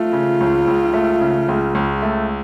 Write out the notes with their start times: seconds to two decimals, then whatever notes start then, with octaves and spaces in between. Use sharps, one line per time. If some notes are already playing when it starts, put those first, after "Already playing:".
Already playing: A3 F4
0.13 C#3
0.40 C#2
0.67 C#2
0.94 A3
1.21 C#3
1.48 C#2
1.75 C#2
2.02 A3